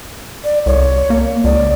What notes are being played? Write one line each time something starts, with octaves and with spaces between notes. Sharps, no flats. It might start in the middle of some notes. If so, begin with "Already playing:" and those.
D5
C2 C#5
A#3
C#2 D5